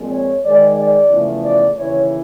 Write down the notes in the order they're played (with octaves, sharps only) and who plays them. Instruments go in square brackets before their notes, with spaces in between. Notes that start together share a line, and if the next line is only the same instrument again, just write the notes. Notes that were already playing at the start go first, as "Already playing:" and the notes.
Already playing: [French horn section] A#2 F3 G#3 C4
C#5
G#2 D#3 G#3 D5
D5
E2 C#3 F3 A3
D5
D#2 C#3 E3 C#5